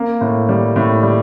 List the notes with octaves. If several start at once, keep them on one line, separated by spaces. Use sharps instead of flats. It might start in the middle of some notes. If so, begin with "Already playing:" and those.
Already playing: A#3
A2
G3
A2
G3